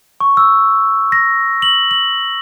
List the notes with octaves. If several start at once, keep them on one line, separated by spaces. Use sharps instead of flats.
C#6
E6
A#6
F#7
F#7